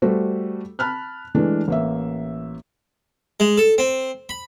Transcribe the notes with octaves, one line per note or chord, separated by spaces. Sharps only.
G3 A3 F#4 C5
A5 B5 F6 F#6
E3 G#3 A3 D4
A1 A#3 E5
G#3
A4
C4
B5